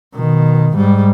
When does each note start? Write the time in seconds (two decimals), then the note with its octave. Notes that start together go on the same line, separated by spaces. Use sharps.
0.15 B2 D#3
0.74 G#2 G3